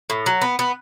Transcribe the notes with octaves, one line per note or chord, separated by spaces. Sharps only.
A2
F#3
B3
B3